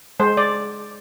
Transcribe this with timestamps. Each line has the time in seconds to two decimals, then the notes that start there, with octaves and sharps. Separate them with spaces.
0.20 G#3 C5
0.37 D5